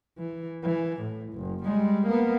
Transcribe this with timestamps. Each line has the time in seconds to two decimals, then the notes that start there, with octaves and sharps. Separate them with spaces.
0.19 E3
0.63 E3
1.01 A2
1.34 F#1
1.64 G3 G#3
2.07 A#3 B3